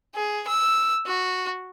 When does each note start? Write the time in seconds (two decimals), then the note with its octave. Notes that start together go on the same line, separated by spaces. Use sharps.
0.15 G#4
0.47 E6
1.06 F#4